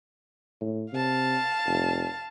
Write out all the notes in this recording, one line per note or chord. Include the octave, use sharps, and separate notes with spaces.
A2
C3 F5 A5
F1